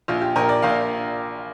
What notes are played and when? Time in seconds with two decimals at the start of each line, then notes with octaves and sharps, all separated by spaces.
0.08 A#1 F4
0.21 G4
0.36 A#1 A#4
0.49 D5
0.62 A#1 F5